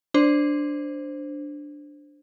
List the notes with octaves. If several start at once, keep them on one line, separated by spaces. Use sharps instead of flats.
D4 C5